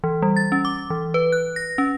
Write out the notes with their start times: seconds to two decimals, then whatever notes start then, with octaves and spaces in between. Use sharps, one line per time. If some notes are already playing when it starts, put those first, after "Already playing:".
0.04 E3
0.22 G3
0.36 A6
0.52 C#4
0.65 D6
0.90 E3
1.14 B4
1.32 F#6
1.56 A#6
1.78 C#4